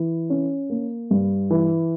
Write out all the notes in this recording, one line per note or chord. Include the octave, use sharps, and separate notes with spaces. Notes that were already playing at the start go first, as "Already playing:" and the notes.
Already playing: E3
C#4
A#3
G2
E3